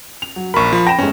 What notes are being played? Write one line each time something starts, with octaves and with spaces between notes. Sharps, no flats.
F7
F#3
A#1 A#4 B5 C#6
F3 B5
G5 B5 A#6 E7
G1 G#2 C#4